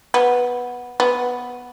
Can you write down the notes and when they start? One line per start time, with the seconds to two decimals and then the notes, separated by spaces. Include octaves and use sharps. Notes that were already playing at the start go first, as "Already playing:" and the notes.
0.14 B3
1.00 B3